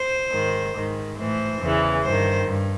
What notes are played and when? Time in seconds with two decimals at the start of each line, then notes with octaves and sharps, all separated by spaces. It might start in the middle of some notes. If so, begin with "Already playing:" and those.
Already playing: C5
0.31 G#2 D#3
0.74 G#2 D#3
1.18 A2 E3 C5
1.61 E2 C#3 E3
2.04 G2 D#3 C5
2.48 G2